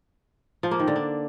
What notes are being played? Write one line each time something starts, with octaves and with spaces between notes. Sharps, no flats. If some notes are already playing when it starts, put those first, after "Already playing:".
F3
A#3
D#3
D3
D4